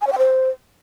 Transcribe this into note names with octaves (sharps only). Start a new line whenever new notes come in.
G#5
C#5
G5
C5